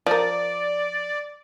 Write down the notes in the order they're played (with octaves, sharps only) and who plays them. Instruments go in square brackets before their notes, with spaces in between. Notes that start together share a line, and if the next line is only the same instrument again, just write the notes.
[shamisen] F3 A#4 [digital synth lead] D5